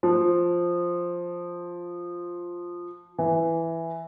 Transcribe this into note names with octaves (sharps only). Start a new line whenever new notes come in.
F3
E3